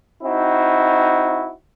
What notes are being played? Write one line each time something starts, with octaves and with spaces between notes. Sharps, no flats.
C4 D#4 E4 F#4